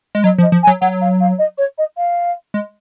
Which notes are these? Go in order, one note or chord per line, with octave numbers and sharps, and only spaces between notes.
G#3
F#3 D#5
F3
D#5
F3
G#5
F#3
F#3 F#5
F5
F5
D#5
C#5
D#5
F5
G#3